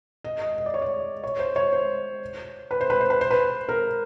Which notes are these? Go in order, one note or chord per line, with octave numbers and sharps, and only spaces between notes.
D#5
D#5
D#5
D5
C#5
D5
C#5
C5
C#5
C5
B4
C5
B4
C5
B4
C5
B4
A#4